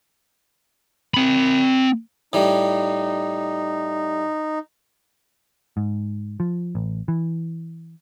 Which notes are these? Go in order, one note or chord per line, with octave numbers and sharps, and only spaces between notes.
C4 B5
A2 G3 D#4
G#2
F3
A1
E3